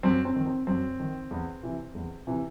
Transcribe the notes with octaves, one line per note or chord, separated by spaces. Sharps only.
F#2 C4
C4
D#3
C4
F#2 C4
D#3
E2
C3 E3
E2
C3 E3